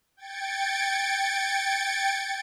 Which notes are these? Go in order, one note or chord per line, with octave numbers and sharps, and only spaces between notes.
G5 G#6 A6 C#7 D7